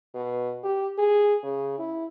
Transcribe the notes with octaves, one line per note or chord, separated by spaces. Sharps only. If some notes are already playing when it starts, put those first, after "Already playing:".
B2
G4
G#4
C#3
E4